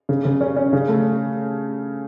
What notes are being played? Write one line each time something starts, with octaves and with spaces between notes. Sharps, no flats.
C#3
C#3
C#4
C#4
C#3
A3